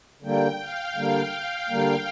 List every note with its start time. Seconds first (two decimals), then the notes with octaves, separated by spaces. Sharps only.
0.22 D3 G3 A#3 G5
0.59 F5
0.96 D3 G3 A#3
1.69 D3 G3 A#3